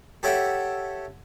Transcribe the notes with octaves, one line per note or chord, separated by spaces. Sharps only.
G4 A4 C#5 E5 F#5 G5